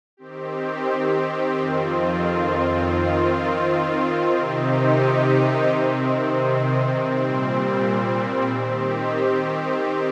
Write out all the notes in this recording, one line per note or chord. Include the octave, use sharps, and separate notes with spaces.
D#3 C4 G4
F2 D#3 C4 F4
D#3 C4 F4
C3 D#3 C4 D#4 G4
C3 D#3 C4
A#2 G3 C4
D#3 C4 G4